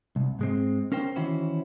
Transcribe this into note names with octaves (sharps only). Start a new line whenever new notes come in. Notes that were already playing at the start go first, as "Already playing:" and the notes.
C2
G#2 G#3 C4
C#4 A#4 C5 G5
D#3 E3 C#4 E4 F#4 C5